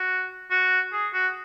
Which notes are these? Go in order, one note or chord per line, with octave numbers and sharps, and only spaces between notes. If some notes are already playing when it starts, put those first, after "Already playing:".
Already playing: F#4
F#4
G#4
F#4